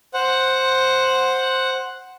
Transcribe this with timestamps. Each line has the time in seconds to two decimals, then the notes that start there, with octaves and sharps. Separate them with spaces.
0.14 C5 F#5